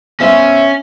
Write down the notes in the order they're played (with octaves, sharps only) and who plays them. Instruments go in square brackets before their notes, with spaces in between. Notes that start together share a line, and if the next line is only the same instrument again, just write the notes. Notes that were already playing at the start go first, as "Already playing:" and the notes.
[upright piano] B3 C5 E5 [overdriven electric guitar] C#4